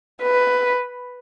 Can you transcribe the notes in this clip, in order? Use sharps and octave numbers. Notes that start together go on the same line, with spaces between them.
B4